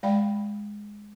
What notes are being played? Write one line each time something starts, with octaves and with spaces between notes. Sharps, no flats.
G#3 D5 F5 G5 B5